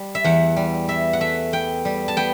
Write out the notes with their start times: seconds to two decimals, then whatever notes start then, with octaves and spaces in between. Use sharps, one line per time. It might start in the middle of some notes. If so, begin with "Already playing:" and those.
Already playing: G3
0.15 E5
0.24 E2 F#5
0.56 G3
0.89 E3 E5
1.13 F#5
1.20 A3 E5
1.53 B3 G5
1.85 G3
2.08 A5
2.17 B3 G5